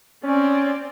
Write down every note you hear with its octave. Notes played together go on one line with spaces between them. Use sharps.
C4 C#4 D5